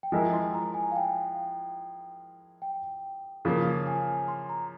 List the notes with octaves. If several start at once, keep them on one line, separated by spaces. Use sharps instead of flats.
G5
F3 G#3 E4 A#4 G#5
C6
A#5
G#5
F5
G5
G5
C#3 F3 A#3 F5
G#5
C6
A#5